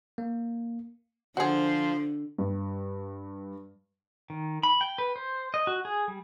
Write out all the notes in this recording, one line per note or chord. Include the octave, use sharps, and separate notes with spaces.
A#3
D3 F3 F#4 G#4 C5
G2
D#3
B5
G5
B4
C5
D#5
F#4
G#4
G3